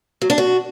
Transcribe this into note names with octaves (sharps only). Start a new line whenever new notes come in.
F#3
D4
F#4